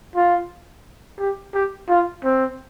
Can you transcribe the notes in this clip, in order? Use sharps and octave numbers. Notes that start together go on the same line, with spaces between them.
F4
G4
G4
F4
C4